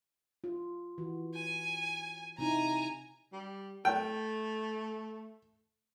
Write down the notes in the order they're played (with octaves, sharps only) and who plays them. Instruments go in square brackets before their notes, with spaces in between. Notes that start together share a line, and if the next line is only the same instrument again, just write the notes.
[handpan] F4
E3 F#4
[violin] G#5
[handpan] C3 D#4 E4 [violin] G#5 A#5
[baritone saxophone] G3
[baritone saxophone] A3 [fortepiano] G5